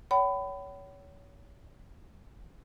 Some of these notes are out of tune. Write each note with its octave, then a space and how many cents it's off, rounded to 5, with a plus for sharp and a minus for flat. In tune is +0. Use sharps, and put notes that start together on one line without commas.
C#5 +25 G5 -45 B5 +20